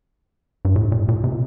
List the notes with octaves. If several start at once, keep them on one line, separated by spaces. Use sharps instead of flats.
G2
A2
A#2
A#2
C3